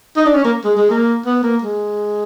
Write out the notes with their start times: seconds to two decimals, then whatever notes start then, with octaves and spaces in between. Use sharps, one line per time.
0.17 D#4
0.26 D4
0.34 C#4
0.45 A#3
0.65 G#3
0.77 G#3
0.90 A#3
1.26 B3
1.43 A#3
1.62 G#3